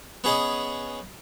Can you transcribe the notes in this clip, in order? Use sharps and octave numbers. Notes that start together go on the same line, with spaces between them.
B3 C#4 G#4 B4 D#5